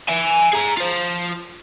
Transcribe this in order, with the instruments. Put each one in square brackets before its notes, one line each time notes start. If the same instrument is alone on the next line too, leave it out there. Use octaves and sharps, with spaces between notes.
[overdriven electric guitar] E5 G#5
G#4 A#5
F4 C5